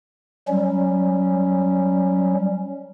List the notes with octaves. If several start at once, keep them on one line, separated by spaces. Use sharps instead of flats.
F#3 G3 C#4